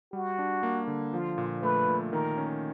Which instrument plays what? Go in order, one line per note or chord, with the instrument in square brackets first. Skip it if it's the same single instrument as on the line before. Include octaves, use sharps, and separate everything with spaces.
[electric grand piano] G3 [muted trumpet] F#4
[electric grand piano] D4
A#3
D3
[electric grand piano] F3 [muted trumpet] F4
[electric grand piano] A#2
[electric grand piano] A3 [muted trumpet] B4
[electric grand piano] A#2
[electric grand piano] D#3 [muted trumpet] A#4
[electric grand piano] C#4